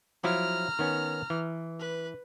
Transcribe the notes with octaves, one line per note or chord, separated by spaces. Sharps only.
F3 F#3 E4 A#5 F6
D#3 B3 C#4
E3
B4